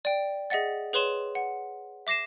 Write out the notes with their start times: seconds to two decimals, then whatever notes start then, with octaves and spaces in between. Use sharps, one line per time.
0.05 D5 G5
0.50 G#4 D#5 E5 F#5 A6
0.93 G#4 B4 C#5 C6 E7
1.35 F#5
2.07 E5 D6 A#6 C7 E7